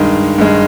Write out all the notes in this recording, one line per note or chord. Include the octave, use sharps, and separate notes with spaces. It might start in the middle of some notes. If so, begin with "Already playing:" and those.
Already playing: G2 D#3 G#3
G2 D#3 G#3